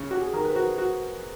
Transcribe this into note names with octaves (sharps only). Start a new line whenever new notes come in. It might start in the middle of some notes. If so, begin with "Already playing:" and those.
Already playing: C#3
F#4 G4
G#4
D#3 A#4
B4
C5
F#4 B4
F#4